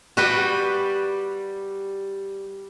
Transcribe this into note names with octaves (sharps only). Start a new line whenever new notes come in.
G3 F#4 B4 G5